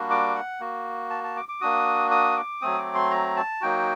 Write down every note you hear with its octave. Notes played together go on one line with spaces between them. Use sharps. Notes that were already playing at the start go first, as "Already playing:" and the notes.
Already playing: G3 A#3 D4 F#4
D6
F#5
A#3 F#4
A5
A5
D6
D6
A#3 D4 F#4 D#6
D#6
D6
F#3 A3 C4 D#6
D6
C6
A#5
A5
F#3 A#3 D#4 F#4 G5